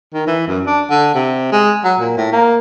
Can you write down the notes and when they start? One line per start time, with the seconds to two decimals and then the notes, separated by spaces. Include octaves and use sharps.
0.13 D#3
0.27 E3
0.47 F#2
0.66 D4
0.90 D3
1.15 C3
1.53 G#3
1.84 F#3
2.00 A#2
2.17 A2
2.33 A#3